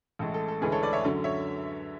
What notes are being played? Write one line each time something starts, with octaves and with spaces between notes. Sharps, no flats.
A1 A2 G#3 A4
A4
A4
D2 C#3 E3 G#3 C#4 G#4 B4
A4 C#5
B4 D5
C#5 E5
F#2 D3 F#3
C#5 E5